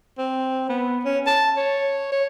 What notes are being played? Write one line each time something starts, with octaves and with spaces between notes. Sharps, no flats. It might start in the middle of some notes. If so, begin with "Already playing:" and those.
C4
B3
C#4
A5
C#5
C#5